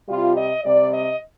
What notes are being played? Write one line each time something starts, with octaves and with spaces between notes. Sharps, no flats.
C3 G3 F4
D#5
C3 G3 D5
D#5